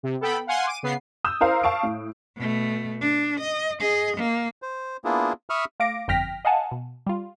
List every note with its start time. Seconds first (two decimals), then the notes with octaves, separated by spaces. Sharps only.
0.03 C3
0.20 B3 A4 G5 B5
0.47 F5 F#5 G#5 C6
0.67 D6 D#7
0.83 C#3 B3 C7
1.25 D#6 E6 G6 E7
1.41 E4 A#4 C5 F5
1.63 F5 A5 C#6 D7
1.83 A2
2.37 B2 A3
3.01 D4
3.41 D#5
3.80 G#4 D#5
4.17 A#3
4.62 C5
5.05 A#3 B3 D4 E4 F4 G#4
5.50 E5 B5 C#6 D#6 F6
5.80 A3 F5 D6 A#6 D7
6.08 G1 F2 G5 F6 A#6 B6
6.45 D#5 F5 F#5 G#5 A5
6.71 B2
7.06 G3 F4